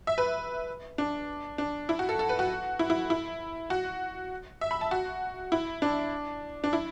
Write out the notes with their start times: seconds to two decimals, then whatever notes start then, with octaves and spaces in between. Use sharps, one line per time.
0.07 E5
0.18 B4
0.98 D4
1.58 D4
1.89 E4
1.99 F#4
2.09 A4
2.19 A4
2.29 B4
2.39 F#4
2.79 E4
2.90 E4
3.10 E4
3.70 F#4
4.61 E5
4.71 B5
4.81 A5
4.91 F#4
5.52 E4
5.82 D4
6.64 D4
6.73 E4